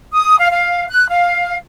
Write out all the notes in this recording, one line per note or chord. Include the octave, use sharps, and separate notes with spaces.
D#6
F5
F5
F#6
F5